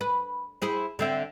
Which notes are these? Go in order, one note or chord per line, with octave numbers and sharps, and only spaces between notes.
B4
E4 G#4 C5
D3 C4 E5